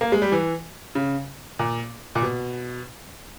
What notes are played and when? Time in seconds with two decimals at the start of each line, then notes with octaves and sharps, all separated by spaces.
0.01 A#3
0.12 G#3
0.22 G3
0.32 E3
0.95 C#3
1.59 A#2
2.15 A#2
2.22 B2